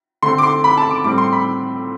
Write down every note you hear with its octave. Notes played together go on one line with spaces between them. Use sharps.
D3 A3 C4 C6
D6
C6
B5
A5
D6
A2 G3 C4 D6
C6
B5